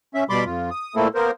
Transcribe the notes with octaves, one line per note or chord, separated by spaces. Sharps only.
C#4 E5
B2 G3 D5 B5 C6 D6
F2 F4
D#6
A#2 A3 A#3 C4 E4 A4
A#3 B3 A#4 C5